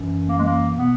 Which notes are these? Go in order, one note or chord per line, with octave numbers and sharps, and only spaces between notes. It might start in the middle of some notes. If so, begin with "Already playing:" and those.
Already playing: F#2 E3
A#3
G#3
A#3
B2 B3